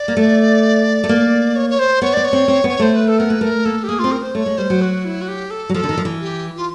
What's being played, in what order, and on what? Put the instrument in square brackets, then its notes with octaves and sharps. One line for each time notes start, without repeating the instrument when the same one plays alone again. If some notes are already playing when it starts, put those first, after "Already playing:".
Already playing: [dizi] D5
[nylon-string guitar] A#3
A3
A3
A#3
[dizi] C#5
C#5
C5
[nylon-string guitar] B3 [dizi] C#5
[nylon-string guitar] B3 [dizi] D5
[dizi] C#5
[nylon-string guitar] C4
C4
B3
[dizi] C#5
[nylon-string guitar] A3 [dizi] C5
[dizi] B4
A4
[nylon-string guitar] B3 [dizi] A#4
[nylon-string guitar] A#3 [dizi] B4
[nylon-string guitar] A3 [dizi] A#4
[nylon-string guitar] A#3 [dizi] A4
[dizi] G4
[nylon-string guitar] A#3 [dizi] G#4
[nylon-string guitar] C4 [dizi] F4
[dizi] A#4
C5
[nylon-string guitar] A3 [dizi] C#5
[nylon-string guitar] G#3
[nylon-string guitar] G3 [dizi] C5
[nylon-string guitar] F#3
[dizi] F#4
E4
F#4
G4
A4
[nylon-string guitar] F#3
[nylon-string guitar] F3 [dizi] A4
[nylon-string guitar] D3
D#3
F3
E3
[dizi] G4
F4